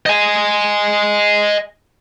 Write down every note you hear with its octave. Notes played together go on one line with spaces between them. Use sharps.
D#5 G#5